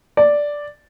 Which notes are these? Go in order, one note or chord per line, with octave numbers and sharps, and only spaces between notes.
D5